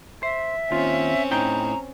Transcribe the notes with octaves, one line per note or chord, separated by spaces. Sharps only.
C5 E5
D#2 C4 C#4 F4
A2 D#4 G5 A#5